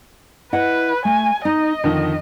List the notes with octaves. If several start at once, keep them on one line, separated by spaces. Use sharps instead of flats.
E4 B4 D#5 F#5
A3 G#5
D#4 D#5
F2 D3 D#3